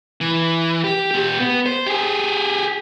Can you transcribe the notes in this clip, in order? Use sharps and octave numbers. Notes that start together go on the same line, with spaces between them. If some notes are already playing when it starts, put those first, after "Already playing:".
E3
G4
A#2 G4
B3
C5
G4 G#4